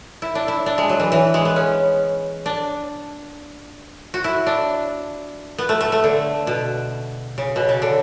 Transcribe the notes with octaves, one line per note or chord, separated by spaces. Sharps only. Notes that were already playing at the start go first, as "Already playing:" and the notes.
E4
D4
E4
D4
G#3
F#3
E3
E3
G#3
B3
C#4
D4
F#4
E4
D4
B3
A3
A3
A3
D3
B2
C#3
B2
C#3
D3